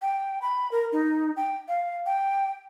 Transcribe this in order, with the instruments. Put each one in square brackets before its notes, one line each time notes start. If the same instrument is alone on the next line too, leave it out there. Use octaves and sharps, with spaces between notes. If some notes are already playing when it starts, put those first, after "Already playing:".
[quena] G5
B5
A#4
D#4
G5
F5
G5